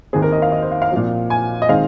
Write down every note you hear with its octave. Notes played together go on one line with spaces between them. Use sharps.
D#2 D#3 C4 G#4
A#4
D#5
F5
D#5
C5
F5
F5
A#2 F3 C4
G#5
D#5
D#3 G#3 C4 F5